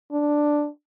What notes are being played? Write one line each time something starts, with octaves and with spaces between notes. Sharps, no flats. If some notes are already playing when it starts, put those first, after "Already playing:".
D4